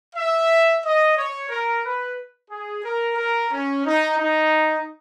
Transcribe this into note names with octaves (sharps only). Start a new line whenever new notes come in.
E5
D#5
C#5
A#4
B4
G#4
A#4
A#4
C#4
D#4
D#4